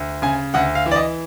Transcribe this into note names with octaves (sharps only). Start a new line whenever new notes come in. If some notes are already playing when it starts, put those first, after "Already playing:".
Already playing: D2
C#3 G#5
D2 F#5
F5
E3
D5
D#5